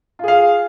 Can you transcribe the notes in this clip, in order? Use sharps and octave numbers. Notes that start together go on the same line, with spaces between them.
F4 G#4 F5